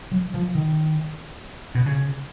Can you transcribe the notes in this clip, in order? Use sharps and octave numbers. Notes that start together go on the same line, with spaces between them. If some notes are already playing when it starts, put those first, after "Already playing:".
F#3
F3
D#3
B2
C#3